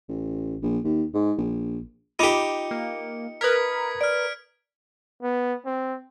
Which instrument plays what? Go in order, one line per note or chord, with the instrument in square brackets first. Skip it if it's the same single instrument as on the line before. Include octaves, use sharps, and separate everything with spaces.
[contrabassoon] A1
A#1
D#2
G#2
A#1
[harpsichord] D#4 G4 [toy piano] F4 B5 D6 [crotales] C#7
[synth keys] A#3
[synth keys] A#4 B4 [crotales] D#6 G#6 B6
[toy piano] D5 [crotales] F6 D7
[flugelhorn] B3
C4